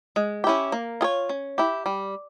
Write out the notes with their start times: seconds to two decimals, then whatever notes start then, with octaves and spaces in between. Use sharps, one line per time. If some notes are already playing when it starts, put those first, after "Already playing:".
0.16 G#3
0.44 C#4 E4 G4
0.72 A#3
1.01 F4 G#4 C#5
1.29 C#4
1.58 E4 G4
1.86 G3